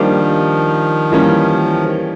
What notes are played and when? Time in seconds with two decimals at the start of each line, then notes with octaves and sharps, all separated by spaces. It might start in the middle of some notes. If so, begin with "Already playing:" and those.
Already playing: D#3 F3 G3 A#3 D4 G4
1.12 E3 G3 A#3 C#4